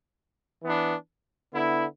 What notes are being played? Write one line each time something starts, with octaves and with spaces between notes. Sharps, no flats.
E3 B3 D4
D3 B3 E4